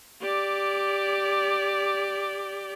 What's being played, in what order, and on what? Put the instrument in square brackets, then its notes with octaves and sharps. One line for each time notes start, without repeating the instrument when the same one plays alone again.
[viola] G4 D5